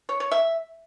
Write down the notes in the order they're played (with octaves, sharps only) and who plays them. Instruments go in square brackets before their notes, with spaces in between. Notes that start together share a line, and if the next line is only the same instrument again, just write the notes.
[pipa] C#5
C#5
E5